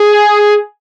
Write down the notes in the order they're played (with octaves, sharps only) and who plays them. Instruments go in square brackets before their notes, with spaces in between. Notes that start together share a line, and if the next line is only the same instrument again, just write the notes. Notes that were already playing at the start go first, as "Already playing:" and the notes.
Already playing: [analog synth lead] G#4